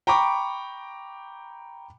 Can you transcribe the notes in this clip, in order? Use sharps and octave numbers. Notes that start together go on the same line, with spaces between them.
G5 A#5 B5 C#6 D6